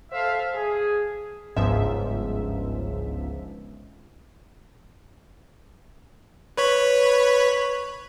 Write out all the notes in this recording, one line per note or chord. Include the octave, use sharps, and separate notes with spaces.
A4 C5 E5 F5
G#4
G1 C#2 G#2 F3 E5
B4 C#5 B5